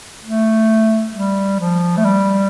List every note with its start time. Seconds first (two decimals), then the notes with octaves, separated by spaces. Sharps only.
0.25 A3
1.15 G3
1.60 F3
1.97 A3
2.05 G3